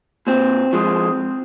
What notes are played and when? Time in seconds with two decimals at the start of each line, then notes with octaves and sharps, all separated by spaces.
0.27 A#2 C4
0.73 F3 G#3